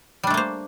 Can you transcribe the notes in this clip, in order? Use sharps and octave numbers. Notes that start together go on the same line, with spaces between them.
G3 A3 A#3 D4 C5